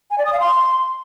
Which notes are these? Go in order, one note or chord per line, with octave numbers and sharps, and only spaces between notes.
G#5
D5
D#6
F5
C6